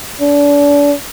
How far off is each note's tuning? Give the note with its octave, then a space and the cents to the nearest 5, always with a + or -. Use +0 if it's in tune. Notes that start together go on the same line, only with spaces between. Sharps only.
D4 -35